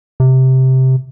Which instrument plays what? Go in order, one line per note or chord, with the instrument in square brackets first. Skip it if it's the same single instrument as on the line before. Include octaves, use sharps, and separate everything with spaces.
[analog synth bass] C3